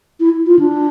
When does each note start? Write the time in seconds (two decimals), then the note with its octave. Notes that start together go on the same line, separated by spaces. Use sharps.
0.20 E4
0.46 F4
0.59 D4